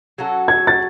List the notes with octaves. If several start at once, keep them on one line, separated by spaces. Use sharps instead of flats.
F#3 C#4 F#4 A4
G#6
A6